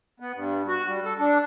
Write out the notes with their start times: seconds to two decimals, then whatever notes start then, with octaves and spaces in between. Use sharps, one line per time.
0.20 B3
0.35 G2
0.68 F#4
0.87 G3
1.04 A4
1.19 D4